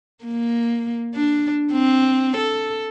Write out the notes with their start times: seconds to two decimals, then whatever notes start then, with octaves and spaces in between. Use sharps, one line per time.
0.24 A#3
1.14 D4
1.73 C4
2.37 A4